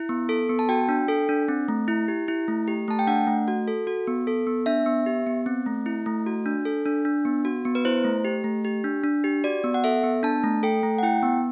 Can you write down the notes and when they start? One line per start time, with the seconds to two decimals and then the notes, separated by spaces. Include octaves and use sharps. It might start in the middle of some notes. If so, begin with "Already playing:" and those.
Already playing: E4
0.09 B3
0.29 A4
0.49 B3
0.59 A5
0.69 F#4 G5
0.89 D4
1.08 A4
1.29 D4
1.48 C4
1.68 A3
1.88 E4
2.08 G4
2.28 E4
2.48 A3
2.68 G4
2.88 A3 A5
2.99 G5
3.07 D4 F#5
3.27 A3
3.48 F#4
3.68 A4
3.87 F#4
4.07 B3
4.27 A4
4.47 B3
4.66 D4 E5
4.86 B3
5.06 G4
5.27 B3
5.46 C4
5.66 A3
5.86 E4
6.06 A3
6.26 F#4
6.46 D4
6.65 A4
6.86 D4
7.05 D4
7.25 B3
7.45 F#4
7.65 B3
7.75 B4
7.85 E4 C5
8.05 A3
8.25 G4
8.44 A3
8.65 G4
8.84 D4
9.04 D4
9.24 G4
9.44 F#4 D5
9.64 B3
9.74 F#5
9.84 A4 E5
10.04 B3
10.23 D4 A5
10.43 A3
10.63 A4 G5
10.83 A3
10.98 F#5
11.03 E4 G5
11.23 B3